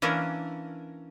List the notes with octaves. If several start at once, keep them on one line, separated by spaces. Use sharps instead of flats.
E3 A#3 C#4 D4 A#4